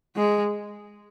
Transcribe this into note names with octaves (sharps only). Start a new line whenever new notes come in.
G#3